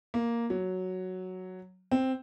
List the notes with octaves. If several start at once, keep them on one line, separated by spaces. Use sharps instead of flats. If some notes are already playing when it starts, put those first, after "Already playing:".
A#3
F#3
C4